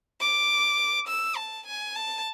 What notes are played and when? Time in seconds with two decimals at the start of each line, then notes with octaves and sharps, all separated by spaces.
0.21 D6
1.08 E6
1.37 A5
1.67 G#5
1.96 A5